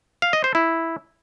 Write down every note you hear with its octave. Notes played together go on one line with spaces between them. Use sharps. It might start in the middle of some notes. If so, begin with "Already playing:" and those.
F5
D#5
C5
E4